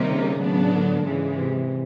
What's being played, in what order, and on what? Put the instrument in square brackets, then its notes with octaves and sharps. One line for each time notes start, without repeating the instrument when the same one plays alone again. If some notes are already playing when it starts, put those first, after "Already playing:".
Already playing: [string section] C3 D#3 G3 A#3 D#4
[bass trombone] C#3
[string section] A2 F#3 B3 D4
[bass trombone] D3
[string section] G#2 E3 G#3 [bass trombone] C#3
[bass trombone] C3